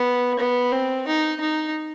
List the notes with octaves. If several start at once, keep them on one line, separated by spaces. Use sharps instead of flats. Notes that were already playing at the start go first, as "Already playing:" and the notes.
Already playing: B3
B3
C4
D#4
D#4